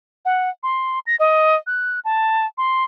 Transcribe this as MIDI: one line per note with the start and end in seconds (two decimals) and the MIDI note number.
0.25 0.49 78
0.63 0.99 84
1.07 1.16 94
1.19 1.56 75
1.67 2.00 90
2.05 2.46 81
2.58 2.84 84